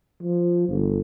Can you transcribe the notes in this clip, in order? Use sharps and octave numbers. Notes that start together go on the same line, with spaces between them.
F3
G1